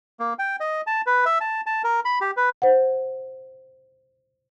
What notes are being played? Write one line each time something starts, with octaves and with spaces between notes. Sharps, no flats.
A#3
G5
D#5
A5
B4
E5
A5
A5
A#4
B5
G4
B4
C5 F#5